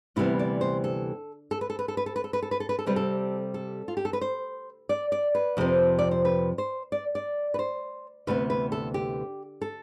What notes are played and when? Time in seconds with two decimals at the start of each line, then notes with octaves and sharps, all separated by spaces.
0.16 D2 C3 E3 G3 B3 E4
0.39 D5
0.61 C5
0.84 A4
1.51 A4
1.61 B4
1.70 A4
1.79 B4
1.88 A4
1.97 B4
2.06 A4
2.16 B4
2.24 A4
2.33 B4
2.42 A4
2.51 B4
2.60 A4
2.69 B4
2.79 A4
2.86 C3 G3 C4 B4
2.96 A4
3.54 A4
3.88 F4
3.97 G4
4.05 A4
4.13 B4
4.21 C5
4.89 D5
5.12 D5
5.35 B4
5.57 F2 C3 F3 C4
5.99 D5
6.11 C5
6.25 B4
6.58 C5
6.92 D5
7.15 D5
7.54 B4
7.59 C5
8.27 D2 C3 E3 B3 B4
8.50 B4
8.72 A4
8.94 G4
9.61 A4